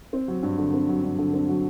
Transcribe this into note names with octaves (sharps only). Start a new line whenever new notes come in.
C4
F#3
G2
D3
C4
F#3
G2
D3
C4
F#3